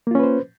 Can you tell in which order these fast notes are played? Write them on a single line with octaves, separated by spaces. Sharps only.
A#3 F4 C#4 B4 C5